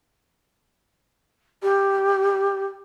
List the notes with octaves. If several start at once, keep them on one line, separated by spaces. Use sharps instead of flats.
G4